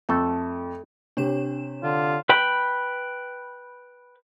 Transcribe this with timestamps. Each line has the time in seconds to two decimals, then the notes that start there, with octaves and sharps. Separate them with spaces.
0.09 F2 A3 A4
1.17 C3 D4 G4 C#5 E7
1.83 D3 F4
2.29 B4 G5 B5